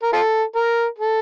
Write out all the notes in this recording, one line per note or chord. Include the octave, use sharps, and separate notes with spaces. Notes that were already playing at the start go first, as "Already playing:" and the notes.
A#4
F4 A4
A#4
A4